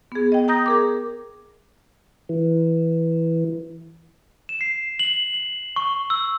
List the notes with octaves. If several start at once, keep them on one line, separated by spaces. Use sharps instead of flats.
B3 G#4
D#5 G5
G5 A#5 D#6 G6 A#6
G#4 A#4 D6
E3
E7
C7
F#7
F#7
C#6
E6